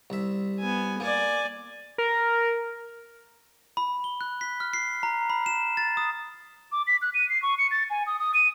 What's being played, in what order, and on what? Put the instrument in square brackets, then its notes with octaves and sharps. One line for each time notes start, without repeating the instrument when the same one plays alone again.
[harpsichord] C2 E5
[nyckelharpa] B3 G#5
[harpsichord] A#3 [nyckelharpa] D5 G#5
[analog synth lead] A#4
[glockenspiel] B5
G7
F#6
B6
F6
C7
A#5
B5
E7
A6
D#6
[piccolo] D6
B6
F#6
D#7
C7
C#6
C#7
A6
G#5
D#6
D#6
D#7